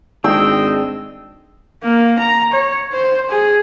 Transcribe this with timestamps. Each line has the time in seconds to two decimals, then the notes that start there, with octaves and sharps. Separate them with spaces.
0.24 G#1 G#3 C4 D4 D#5 G5 E6
1.83 A#3
2.19 A#5
2.52 C#5
2.92 C5
3.29 G#4